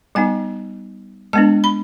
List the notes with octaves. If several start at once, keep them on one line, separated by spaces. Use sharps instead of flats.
G3 B3 D#4 G#5
G#3 B3 D4 A5
B5